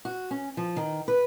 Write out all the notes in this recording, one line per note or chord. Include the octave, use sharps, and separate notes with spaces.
F#4
C#4
F3
D#3
B4